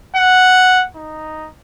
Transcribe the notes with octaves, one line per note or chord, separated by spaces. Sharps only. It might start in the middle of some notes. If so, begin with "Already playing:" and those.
F#5
D#4